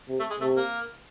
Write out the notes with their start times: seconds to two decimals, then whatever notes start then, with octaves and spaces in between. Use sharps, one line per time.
0.08 C3
0.20 A3
0.30 G#3
0.40 C3 A3
0.57 A#3